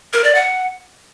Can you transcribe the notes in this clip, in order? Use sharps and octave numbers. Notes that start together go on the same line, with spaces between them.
A#4
D5
F#5